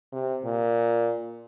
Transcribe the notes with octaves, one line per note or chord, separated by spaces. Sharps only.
C3
A#2